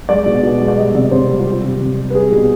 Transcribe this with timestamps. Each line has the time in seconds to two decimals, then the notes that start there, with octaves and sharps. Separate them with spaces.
0.09 G#3 D5
0.26 B2
0.43 B2
0.61 G#3
0.68 D5
0.78 G3 D#5
0.95 C3 D5
1.11 C3 C5
1.29 G3
1.39 F4
1.46 G3 G4
1.64 C3
1.81 C3
1.98 G3
2.10 B4
2.15 G3 G#4
2.32 B2